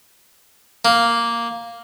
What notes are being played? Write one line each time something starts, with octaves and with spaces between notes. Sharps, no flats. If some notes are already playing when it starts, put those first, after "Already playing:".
A#3